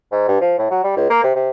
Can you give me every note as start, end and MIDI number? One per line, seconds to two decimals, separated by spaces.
0.12 0.28 44
0.28 0.41 43
0.41 0.54 53
0.58 0.69 45
0.71 0.81 54
0.84 0.94 55
0.97 1.09 37
1.10 1.21 58
1.23 1.32 48
1.35 1.50 48